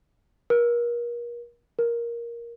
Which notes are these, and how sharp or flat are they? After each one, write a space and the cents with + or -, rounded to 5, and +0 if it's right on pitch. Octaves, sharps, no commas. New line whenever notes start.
A#4 +35
A#4 +10